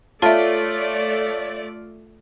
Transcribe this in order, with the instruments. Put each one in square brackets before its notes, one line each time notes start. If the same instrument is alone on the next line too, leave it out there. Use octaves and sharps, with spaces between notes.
[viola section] A3 D5 [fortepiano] F4 [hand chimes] A4 C#5 [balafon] E5 A5